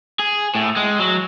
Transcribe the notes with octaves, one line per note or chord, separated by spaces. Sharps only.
G#4
A2
G#3
F#3